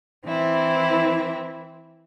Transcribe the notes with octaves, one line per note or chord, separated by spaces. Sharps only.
E3 C4 E4